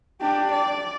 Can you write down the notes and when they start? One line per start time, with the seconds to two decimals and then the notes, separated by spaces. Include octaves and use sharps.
0.21 D4 G4
0.51 D5